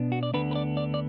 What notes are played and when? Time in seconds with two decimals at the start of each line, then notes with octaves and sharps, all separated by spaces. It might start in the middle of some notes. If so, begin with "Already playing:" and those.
Already playing: B2 B3 D4
0.12 F#4
0.23 D5
0.34 D2 D3 B3 D4 B4
0.51 B4
0.55 D5
0.77 D5
0.94 D5